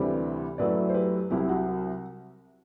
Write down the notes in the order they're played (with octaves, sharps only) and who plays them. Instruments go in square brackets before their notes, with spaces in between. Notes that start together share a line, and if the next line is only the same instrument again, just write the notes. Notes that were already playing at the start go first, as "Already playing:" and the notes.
Already playing: [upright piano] D2 C3 E3 G3 C4 [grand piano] G4 B4
[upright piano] F#2 F#3 A3 E4 [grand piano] B4 D5
[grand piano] C5
G4 B4
[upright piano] C2 C3 F#3 [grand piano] E4 G4
[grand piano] F#4